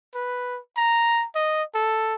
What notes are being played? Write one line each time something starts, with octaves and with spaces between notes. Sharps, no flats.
B4
A#5
D#5
A4